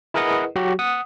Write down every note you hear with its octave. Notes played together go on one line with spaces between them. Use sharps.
E4 G#4 A#4 B4 D#5 F#5
F#3 F#4 G4
F#5 D#6